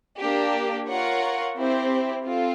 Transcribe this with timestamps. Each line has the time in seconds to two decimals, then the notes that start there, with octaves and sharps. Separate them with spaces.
0.19 A#3 D4 G4
0.88 F4 A#4 C#5 F#5
1.56 C4 E4 G4 C5
2.23 C4 F4 A4